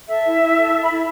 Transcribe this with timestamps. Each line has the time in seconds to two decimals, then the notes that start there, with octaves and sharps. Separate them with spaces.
0.08 A4 E5
0.24 E4
0.40 E4
0.57 A4
0.72 A4
0.83 B5
0.88 E4
0.94 E5